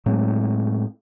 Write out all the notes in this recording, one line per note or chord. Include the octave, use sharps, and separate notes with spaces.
A2 F#3 G#3 C4